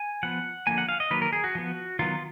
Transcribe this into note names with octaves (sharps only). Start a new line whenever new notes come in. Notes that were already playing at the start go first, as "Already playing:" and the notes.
Already playing: G#5
F3 B3 F#5
D3 F3 A#3 G#5
F#5
F5
D#5
D#3 F#3 A#3 B4
A#4
G#4
F#4
F3 B3
D#3 F#3 B3 F4